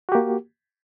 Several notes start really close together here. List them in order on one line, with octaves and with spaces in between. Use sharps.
F#4 G4 A#3